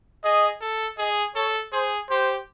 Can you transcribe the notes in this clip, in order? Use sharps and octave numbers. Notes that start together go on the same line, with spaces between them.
G#4 D#5
A4
G#4 D#5
A4 C#5
G#4 C5
G4 C5